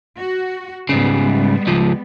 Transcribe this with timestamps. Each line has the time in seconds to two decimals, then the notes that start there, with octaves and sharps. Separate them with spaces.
0.18 F#4
0.89 G#2 C#3 G3 G#3 B3
1.67 C#2 F3